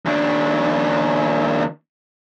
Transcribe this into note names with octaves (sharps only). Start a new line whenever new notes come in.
D#2 D4